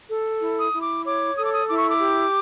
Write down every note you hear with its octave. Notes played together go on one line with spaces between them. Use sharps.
A4
E4
D#6
E4
D6
C#5 D6
A4 D#6
D6
D#6
E4 D6
C#6
D6
G4